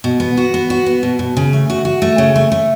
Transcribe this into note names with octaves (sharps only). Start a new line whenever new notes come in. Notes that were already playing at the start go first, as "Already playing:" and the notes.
B2
B3
F#4
B3
F#4
B3
B2
B2
C#3
A3
F#4
F#4
A3
C#3
A3
A3